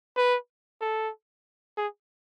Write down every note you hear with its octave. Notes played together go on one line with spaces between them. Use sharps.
B4
A4
G#4